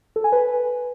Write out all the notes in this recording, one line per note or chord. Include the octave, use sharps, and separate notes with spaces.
A4
G#5
B4